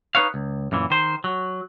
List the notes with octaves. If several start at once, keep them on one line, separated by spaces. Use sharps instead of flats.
D#4 E4 B4 C#5 F5
C#2
F#2 A#2 E3
D#3 C5
F#3